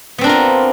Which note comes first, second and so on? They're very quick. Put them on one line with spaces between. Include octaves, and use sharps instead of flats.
B3 C4 D4 A#4 F4